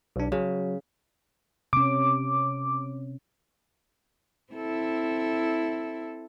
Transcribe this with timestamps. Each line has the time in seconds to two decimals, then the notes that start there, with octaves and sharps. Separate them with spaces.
0.16 B1 D4
0.32 C#3 F#3
1.73 C3 C#4 D6
4.53 C4 E4 A4